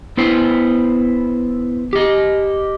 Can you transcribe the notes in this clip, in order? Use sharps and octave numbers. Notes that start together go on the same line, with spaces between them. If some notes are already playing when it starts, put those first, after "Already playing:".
B3 E4 C5
G4 D#5